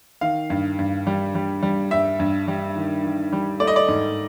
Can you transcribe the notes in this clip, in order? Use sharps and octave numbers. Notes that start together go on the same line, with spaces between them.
D#3 F5
G2
G2
G3
G3
G3
G2 E5
G2
G3
D#3
D#3
G3
A3 D5
D#5
D5
G#2